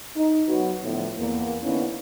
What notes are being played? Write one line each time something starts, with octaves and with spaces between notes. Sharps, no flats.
D#4
F#3 B3 F#4
A2 D3 F3 B3
E2 A#3
D3 A#3 B3 C#4 D#4 E4